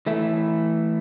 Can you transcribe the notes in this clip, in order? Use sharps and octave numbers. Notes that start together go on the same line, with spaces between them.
E3 A3 E4